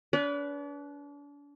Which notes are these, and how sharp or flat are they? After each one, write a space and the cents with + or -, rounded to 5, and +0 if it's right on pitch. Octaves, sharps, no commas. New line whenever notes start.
D4 -40 B4 +0 D5 -40